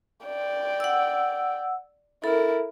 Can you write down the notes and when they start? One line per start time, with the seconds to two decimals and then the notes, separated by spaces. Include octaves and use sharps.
0.25 D5 G5
0.80 F#5 E6
2.24 E4 A4 A#4